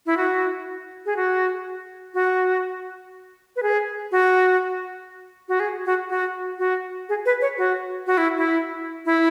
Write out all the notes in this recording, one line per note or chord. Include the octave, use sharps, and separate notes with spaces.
E4
F#4
G#4
F#4
F#4
B4
G#4
F#4
F#4
G#4
F#4
F#4
F#4
G#4
B4
C#5
F#4
F#4
E4
E4
E4